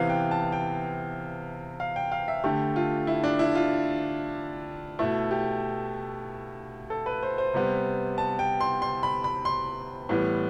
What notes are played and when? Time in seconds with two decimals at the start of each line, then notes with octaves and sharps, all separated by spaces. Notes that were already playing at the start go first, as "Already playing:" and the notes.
Already playing: C3 E3 B3 F5
0.10 G5
0.31 A5
0.52 G5
1.80 F5
1.96 G5
2.12 F5
2.28 E5
2.44 D3 A3 G4
2.76 F4
3.07 E4
3.24 D4
3.39 E4
3.55 F4
4.99 B2 A3 E4
5.31 G4
6.90 A4
7.06 B4
7.23 C5
7.38 C5
7.54 C3 G3 B3
8.18 A5
8.39 G5
8.60 C6
8.82 C6
9.03 B5
9.24 B5
9.45 C6
10.09 A2 E3 G3 B3